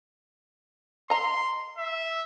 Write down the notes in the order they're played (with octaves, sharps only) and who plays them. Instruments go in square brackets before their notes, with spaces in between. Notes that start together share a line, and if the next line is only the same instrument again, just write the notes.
[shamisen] D#5 A#5 [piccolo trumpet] C6
[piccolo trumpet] E5